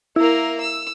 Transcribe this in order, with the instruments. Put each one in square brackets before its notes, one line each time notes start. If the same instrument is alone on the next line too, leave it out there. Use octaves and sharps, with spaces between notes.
[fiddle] A#3 A#4 [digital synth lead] E4
[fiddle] E6